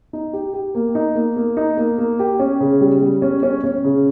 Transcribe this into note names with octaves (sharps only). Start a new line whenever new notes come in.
D#4
G4
G4
A#3
D#4
A#3
A#3
D#4
A#3
A#3
G4
C#4
C#3
G3
G3
C#4
C#4
C#4
C#3